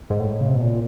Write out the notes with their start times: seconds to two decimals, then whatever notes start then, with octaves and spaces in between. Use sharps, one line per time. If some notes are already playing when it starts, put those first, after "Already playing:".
0.10 G#2
0.19 A2
0.41 C#3
0.48 C3
0.55 B2
0.61 A#2